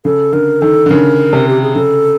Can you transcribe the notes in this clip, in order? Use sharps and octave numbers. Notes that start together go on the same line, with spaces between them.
C#3 A4
D3 A#4
D#3 A4
D3
C#3 A#4
C3
G4
G#4
C#3 A4